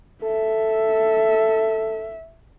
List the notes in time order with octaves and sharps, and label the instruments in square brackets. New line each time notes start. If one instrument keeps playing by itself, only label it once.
[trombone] A4 [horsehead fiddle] E5